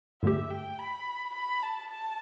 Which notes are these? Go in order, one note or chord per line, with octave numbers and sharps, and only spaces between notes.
G2 D3 A3 G4 E5
G5
B5
B5
A5
A5